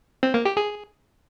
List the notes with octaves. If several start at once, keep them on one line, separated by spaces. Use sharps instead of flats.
C4
A#3
G4
G#4